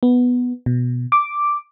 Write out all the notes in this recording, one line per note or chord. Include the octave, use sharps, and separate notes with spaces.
B3
B2
D6